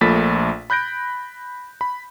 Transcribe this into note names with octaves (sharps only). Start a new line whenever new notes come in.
A#1 A#2 A3 B5 A6 B6
B5 F#6 G6 A#6 D7
B5